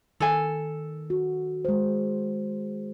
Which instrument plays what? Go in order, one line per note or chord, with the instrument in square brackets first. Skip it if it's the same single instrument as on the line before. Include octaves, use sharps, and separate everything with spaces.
[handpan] D#3 [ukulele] A4 G#5
[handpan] F#4
G#3 C5